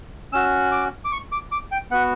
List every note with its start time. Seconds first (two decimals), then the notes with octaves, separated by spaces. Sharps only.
0.33 C#4 F#4 E6
0.72 D6
1.05 D6
1.12 C#6
1.32 D6
1.52 D6
1.72 G5
1.91 B3 F#4 F#5